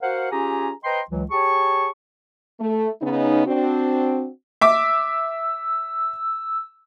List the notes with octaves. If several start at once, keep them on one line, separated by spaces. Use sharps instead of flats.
F#4 A#4 C5 F5 F#5
C#4 F4 G4 G#4 G#5 A#5
B4 C5 D#5 G5 A#5 C6
C#2 E3 F#3
G4 G#4 C#5 A5 C#6
A3
C#3 B3 C#4 D#4
C4 D4 F#4
E5 D6 E6